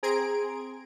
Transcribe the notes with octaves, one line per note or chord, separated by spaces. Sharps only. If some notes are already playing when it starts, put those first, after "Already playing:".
C4 G#4 A#5 C6 G#6 D7